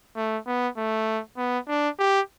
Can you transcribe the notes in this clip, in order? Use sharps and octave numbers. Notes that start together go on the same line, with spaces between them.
A3
B3
A3
B3
D4
G4